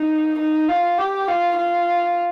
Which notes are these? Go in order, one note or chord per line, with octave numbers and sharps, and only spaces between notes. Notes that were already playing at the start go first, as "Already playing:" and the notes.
Already playing: D#4
D#4
F4
G4
F4
F4